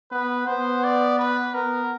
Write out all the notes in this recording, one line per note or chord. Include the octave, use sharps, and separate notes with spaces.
B3 B4
B3 C5
D5
B4
B3 A#4